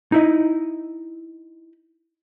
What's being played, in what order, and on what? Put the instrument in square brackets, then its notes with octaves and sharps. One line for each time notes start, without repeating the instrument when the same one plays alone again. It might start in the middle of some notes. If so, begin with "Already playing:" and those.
[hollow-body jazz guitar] D#4 E4 D#5